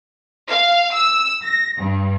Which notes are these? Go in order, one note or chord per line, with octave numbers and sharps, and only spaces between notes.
F5
E6
A#6
G2